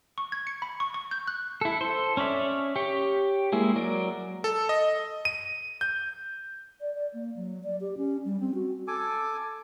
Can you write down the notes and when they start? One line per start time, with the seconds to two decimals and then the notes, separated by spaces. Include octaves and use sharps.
0.18 C#6
0.32 G#6
0.47 C#7
0.62 B5
0.80 C#6
0.94 C#6
1.11 G6
1.28 F#6
1.61 E4 A4
1.81 A4 C5
2.17 C#4 C#5 D5 E5
2.76 G4 C#5
3.53 G#3 A#3 E4 G#4
3.76 F#3 A#4 D5
4.44 A4
4.69 D#5
5.25 D#7
5.81 G6
6.81 D5
6.95 D5
7.14 A#3
7.36 F#3
7.64 D5
7.81 G4
7.97 C#4
8.25 G3
8.40 C4
8.55 F#4
8.88 A4 G#5 D6